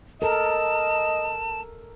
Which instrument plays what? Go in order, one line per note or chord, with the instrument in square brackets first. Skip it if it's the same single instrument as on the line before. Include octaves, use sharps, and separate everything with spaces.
[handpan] A4 A#4 [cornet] D#5 [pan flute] A5